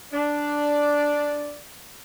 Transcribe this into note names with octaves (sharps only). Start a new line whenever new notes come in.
D4 D5